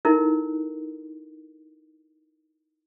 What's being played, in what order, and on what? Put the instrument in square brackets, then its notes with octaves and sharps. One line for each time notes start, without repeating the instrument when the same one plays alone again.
[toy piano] D#4 E4 A4 A#4